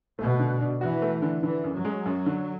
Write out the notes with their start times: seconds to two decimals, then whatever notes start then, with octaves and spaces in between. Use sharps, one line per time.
0.19 B2 A3
0.39 D3
0.61 D4
0.81 E3 F#4
1.02 A3
1.22 D3
1.43 D3 E3
1.64 F#2
1.75 F#3
1.85 G#3
2.06 F#2
2.26 D3